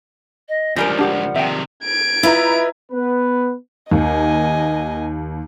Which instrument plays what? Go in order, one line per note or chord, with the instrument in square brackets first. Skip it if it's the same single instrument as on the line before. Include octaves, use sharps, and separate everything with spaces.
[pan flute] D#5
[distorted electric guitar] C#2 D3 [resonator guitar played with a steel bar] F3 G3 A#4 [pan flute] G#5 [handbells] A#6
[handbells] D4 G4 D6 [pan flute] F#5
[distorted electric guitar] C3 D#3 [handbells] E5 G5
[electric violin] G#6 D7
[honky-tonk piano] E4 A#5 [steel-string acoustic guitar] F4 B4 D#5
[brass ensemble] B3 B4
[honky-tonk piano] D#2 [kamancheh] D#5 G#5